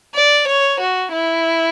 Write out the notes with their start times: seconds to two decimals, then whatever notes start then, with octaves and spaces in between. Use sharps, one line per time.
0.15 D5
0.48 C#5
0.80 F#4
1.13 E4